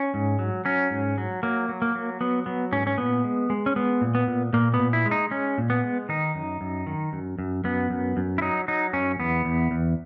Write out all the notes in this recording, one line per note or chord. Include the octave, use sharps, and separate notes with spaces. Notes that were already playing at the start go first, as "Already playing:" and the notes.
Already playing: C#4
G#2
F#3
F#3 C#4
G#2
F#3
F#3 A#3
F#3
A#3
F#3
F#3 B3
F#3 B3
G#2 C#4
C#4
A#2 B3
G#3
G#3
C#4
G#3 B3
A#2
B3
A#2
A#2 A#3
B3
A#2
E4
G#3
D#4
G#3 C#4
A#2
B3
G#3
D#3 D#4
F#2
F#2
D#3
F#2
F#2
F#2 B3
F#2
F#2
E4
F#3 D#4
F#3 D#4
F#2 C#4
E2 B3
E2
E2